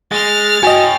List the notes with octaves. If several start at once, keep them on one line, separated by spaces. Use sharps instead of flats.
G#3 F6 A6
F#4 C#5 D#5 G5 G#5